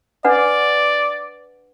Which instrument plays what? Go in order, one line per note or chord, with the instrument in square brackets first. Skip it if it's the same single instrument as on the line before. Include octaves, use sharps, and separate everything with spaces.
[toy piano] D4 B4 F#5 [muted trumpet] D5